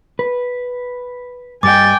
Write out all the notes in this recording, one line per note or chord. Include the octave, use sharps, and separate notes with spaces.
B4
G2 G3 D#5 G5 G#5 D6 A6